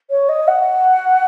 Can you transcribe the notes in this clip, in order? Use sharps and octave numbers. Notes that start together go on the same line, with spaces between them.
C#5
D#5
F#5